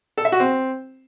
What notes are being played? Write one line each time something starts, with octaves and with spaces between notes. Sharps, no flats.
A4
E5
F#4
C4